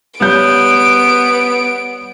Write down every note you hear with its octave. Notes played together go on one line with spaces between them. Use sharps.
G3 B3 C#5 G6 D7